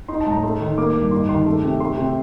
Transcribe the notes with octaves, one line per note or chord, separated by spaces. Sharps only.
D#4 C6
A5
A2 A#5
A3 C6
D#3
A#3 D6
G2
D#4 C6
D#3 C6
A3
C3
A3 C6
C3